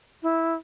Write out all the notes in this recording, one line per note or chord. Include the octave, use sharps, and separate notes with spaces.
E4